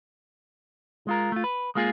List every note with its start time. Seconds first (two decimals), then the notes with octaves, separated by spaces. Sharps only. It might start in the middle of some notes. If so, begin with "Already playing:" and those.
1.07 G#3 F4 A#4
1.32 A3 F4
1.44 B4
1.75 G#3 A#3 F4 G#4